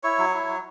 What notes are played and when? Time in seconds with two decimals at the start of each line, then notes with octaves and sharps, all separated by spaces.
0.03 E4 C#5
0.18 F#3
0.34 E4
0.49 F#3